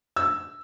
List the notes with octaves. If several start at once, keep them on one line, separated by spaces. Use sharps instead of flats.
E6